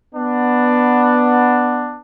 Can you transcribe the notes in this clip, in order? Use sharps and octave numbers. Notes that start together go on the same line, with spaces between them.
B3 D4